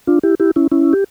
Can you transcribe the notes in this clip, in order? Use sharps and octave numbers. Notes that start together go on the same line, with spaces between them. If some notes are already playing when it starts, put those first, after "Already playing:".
D4 F4
E4 G4
E4 G4
C#4 E4
C#4 E4
G4